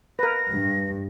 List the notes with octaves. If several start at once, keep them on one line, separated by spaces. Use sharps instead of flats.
A#4 B4 A#6
G2